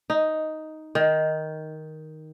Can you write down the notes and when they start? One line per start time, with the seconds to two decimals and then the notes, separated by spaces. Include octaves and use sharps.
0.10 D#4
0.95 D#3